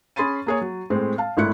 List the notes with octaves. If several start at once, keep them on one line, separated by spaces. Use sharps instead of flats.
C#4 G#4 B5 C6 A6 D#7
A#3 G#4 C#5
F#3
A2 G#3 C4
F5 A5
G#1 A2 E4 F#6 C#7